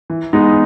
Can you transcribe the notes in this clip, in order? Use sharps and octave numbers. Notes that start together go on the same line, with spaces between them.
E3
G#3 B3 D#4